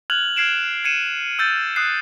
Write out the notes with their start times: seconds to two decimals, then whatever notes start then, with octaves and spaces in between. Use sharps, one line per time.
0.10 F6 F#6 G#6 F7 F#7
0.37 F6 G#6 C7 D7 E7
0.84 G#6 C7 C#7 D#7 E7
1.39 E6 G6 A6
1.76 D#6 F#6 C7